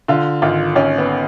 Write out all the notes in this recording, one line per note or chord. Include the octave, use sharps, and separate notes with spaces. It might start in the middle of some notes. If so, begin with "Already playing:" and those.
D3 F4
G#1 F4
G#1 C#4
B3